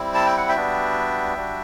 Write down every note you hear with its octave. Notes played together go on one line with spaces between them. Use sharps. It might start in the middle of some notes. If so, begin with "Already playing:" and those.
Already playing: G3 C4 E4
A5
G5
F#5
E5 G5
G3 B3 D4 F#4
G3 D4 F#4